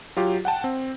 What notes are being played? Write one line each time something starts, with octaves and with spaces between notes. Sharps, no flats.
F#3 F4 G4
F#5 G5 A5
C4